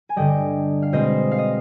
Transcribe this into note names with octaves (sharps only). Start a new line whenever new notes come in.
G#5
G2 D3 G3 D#5 G5
F5
B2 G#3 C4 C5 D#5
F5
D#5